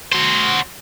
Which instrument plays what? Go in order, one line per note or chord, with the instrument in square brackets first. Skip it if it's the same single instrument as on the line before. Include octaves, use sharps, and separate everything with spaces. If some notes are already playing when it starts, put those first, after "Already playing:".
[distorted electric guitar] F#4 C5